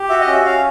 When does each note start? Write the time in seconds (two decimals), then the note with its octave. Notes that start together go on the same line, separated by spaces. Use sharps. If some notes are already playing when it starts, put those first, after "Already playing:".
Already playing: G4
0.10 F#4 E5
0.21 D#5
0.27 C#4
0.32 E5
0.45 C#4 F5